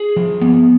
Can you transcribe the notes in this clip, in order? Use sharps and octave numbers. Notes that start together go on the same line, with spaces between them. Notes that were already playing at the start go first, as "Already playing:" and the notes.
Already playing: G#4
F3
B3